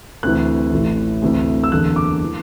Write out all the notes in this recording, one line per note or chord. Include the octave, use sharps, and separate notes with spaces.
D2 C3 E3 F#6
A1 A2 E3
D2 C3 E3
E6
F#1 E2 D3 F#6
D6
E3